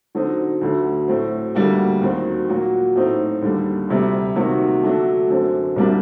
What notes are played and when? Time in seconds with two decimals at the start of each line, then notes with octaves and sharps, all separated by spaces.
0.15 D3 F#3 C4 D#4
0.61 D2 D3 F#3
1.08 A2 F#3 C4
1.55 D2 D3 G3 A#3 F#4
2.01 D#2 D#3 F#3 C4
2.48 A#2 F#3 A#3 F#4
2.96 A2 F#3 C4 D#4
3.42 D#2 D3 G3
3.89 D2 C3 G3
4.35 C3 D#3 F#3 A#3 F#4
4.83 D3 F#3 A3 D4
5.30 F#2 D3 F#3 C4
5.76 C2 C3 G3 A#3 D4